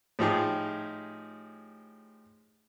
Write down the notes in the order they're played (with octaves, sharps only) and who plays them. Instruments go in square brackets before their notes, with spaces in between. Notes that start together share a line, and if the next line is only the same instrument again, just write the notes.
[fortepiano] A2 F3 D#4 G4 G#4